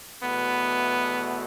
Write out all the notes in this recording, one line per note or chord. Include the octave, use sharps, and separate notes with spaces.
E2 B2 A3 B3